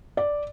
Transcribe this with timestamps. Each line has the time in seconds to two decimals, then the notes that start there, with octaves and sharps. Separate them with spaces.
0.17 D5